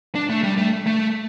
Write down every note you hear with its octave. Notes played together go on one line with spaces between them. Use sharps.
D4
A3
G3
A3
A3